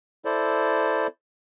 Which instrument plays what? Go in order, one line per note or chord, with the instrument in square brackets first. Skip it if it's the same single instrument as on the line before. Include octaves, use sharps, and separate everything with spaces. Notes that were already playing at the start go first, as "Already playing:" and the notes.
[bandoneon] E4 A4 C5 D5